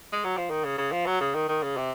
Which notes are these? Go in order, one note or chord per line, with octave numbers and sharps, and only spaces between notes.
G#3
F#3
F3
D#3
C#3
C#3
F3
F#3
C#3
D#3
D#3
C#3
C3